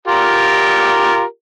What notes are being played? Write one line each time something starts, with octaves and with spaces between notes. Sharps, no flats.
F4 G4 A#4